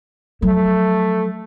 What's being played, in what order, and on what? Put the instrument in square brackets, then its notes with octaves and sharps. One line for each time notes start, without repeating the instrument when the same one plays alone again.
[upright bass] F3 F#3 [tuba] A3